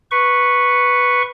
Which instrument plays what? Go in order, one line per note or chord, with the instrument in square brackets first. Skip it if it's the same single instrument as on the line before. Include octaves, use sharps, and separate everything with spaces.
[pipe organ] B4 C#6